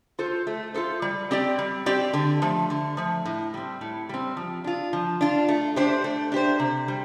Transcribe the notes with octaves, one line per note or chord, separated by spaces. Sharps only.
F4 A4 C5
A3
F4 A4 C5
G3
C4 G4 D5
G3
C4 G4 D5
D3
F3 A3
D3
F3 A3
A2
G3 C4
A2
G3 C4
F3
D4 F4
F3
D4 F4
A3
D4 G4 C5
A3
D4 G4 C5
C3
G3